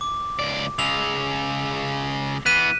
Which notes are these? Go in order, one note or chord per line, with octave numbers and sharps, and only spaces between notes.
D6
C#2 D5
C#3 G#3 E6 F7
E3 B3 F#6 B6 D#7